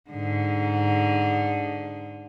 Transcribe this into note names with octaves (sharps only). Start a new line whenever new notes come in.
G#2 D3